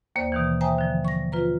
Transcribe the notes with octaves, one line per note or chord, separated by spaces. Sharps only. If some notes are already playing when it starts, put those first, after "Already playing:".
D#2 A#3 C5 D5
B2 D#3 E3
C5 E5 G5 G#5 A#5 D#6
D3 F3
C#6 A#6
F4 B4 A#5